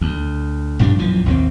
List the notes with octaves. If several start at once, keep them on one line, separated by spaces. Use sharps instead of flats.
D2
A#1 G2 G3 D4
A#1 F#2 E3 F3
A1 D#2 E3 C4